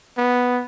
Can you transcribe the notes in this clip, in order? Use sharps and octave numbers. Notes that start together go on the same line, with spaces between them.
B3